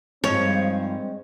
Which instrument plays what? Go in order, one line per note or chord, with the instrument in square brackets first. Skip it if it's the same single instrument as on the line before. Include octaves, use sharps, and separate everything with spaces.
[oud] G2 D#3 F3 [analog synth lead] G#3 [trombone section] C4 [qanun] C#5